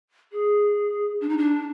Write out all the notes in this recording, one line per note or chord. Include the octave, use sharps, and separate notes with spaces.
G#4
D4
D#4
D4